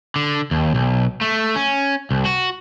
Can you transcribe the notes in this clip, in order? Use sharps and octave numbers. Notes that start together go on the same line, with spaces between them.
D3
D#2
B1
A3
C#4
C2
F#4